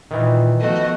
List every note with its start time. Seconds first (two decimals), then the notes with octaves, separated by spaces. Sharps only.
0.11 A#2 D#3 E3
0.59 F3 A3 B3 F#4 D#5